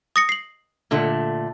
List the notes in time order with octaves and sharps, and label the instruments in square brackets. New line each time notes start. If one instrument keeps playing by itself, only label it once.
[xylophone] D#6 A#6 C#7
C7 F#7
[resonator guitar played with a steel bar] A#2 D3 A3